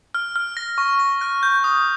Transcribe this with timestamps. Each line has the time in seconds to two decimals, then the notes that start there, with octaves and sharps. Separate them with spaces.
0.14 F6
0.36 F6
0.57 A#6
0.78 C#6
0.99 A#6
1.21 F#6
1.43 G6
1.64 D#6